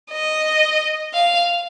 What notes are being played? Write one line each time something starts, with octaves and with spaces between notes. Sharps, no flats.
D#5
F5